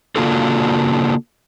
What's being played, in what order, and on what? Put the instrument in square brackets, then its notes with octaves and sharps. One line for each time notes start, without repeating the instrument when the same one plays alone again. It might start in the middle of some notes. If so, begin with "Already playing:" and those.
[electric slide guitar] C#3 A#3 D4 F4 F#4 A4